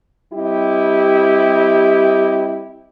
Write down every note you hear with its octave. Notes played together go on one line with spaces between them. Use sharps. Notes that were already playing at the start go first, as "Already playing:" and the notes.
G3 C4 E4 G4 D#5